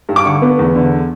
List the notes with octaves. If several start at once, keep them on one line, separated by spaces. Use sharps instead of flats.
G2
D6
D3 C#6
B3
E2
D3